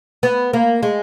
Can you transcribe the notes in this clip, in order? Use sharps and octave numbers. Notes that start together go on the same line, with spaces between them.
B3
A#3
G#3